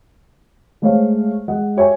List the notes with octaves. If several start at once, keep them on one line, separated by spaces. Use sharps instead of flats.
G#3 A3 C5 C#5 F5
G#3 D#5 F#5
G4 C#5 E5 G5 G#5